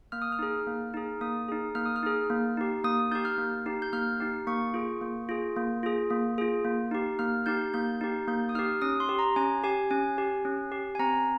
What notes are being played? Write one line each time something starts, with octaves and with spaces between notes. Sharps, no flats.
A#3 F6
D#6
F6
D#4 G#4
A#3
D#4 G#4
A#3 D#6
D#4 G#4
A#3 F6
D#6
F6
D#4 G#4
A#3
D#4 G4
A#3 D#6
D#4 G4 G6
F6
A#3
D#4 G4
G6
A#3 F6
D#4 G4
A#3 C#6
F4 G#4
A#3
F4 G#4
A#3
F4 G#4
A#3
F4 G#4
A#3
D#4 G4
A#3 F6
D#4 G4 G6
A#3 G6
D#4 G4
A#3 G6
D#6
D#4 G4 F6
C#4 D#6
C6
G4
A#5
C#4 G#5
G4 G#5
C#4 G#5
G4
C#4
G4
G#5
C4 A#5